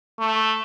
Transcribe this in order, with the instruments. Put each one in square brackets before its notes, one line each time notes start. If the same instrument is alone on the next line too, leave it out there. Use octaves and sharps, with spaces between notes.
[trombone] A3